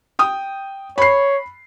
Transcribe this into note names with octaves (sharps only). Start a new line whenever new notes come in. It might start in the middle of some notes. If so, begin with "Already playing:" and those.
G5 D#6
C#5 B5 C7